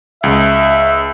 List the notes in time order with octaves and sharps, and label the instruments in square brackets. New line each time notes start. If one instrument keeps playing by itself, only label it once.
[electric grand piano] C#2 [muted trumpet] E5